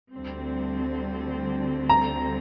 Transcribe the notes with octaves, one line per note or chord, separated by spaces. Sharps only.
D2 D3 G3 C4
A#5